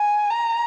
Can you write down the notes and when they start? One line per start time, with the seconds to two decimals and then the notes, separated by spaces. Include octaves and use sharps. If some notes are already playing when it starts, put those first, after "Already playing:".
Already playing: G#5
0.30 A#5